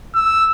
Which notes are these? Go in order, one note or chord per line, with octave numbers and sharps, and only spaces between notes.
E6